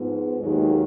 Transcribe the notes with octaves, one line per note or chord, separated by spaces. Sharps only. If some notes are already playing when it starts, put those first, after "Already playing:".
Already playing: G#2 F3 B3
D#2 D#3 F#3 G#3